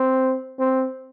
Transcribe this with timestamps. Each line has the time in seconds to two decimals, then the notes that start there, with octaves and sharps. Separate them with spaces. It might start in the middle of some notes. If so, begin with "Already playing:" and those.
Already playing: C4
0.59 C4